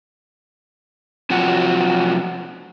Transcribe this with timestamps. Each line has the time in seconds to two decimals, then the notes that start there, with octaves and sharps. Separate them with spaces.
1.30 C3 F3 F#3 F#4